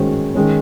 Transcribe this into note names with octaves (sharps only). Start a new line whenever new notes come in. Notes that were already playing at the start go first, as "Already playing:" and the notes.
Already playing: D#3 G#3 C#4 F#4 C5
D#3 G#3 C#4